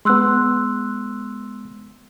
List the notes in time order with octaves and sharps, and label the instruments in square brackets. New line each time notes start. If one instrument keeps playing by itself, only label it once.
[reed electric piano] G#3 B3 [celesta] C6 E6 F#6